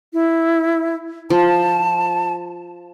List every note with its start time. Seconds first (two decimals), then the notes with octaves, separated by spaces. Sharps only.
0.13 E4
1.30 F3 A5